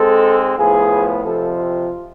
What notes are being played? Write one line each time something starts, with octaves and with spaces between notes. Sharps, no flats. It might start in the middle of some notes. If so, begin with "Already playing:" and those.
Already playing: G#2 G#3 C4 A4
A2 F3 B3 G#4
F2 C3 F3 A4
F4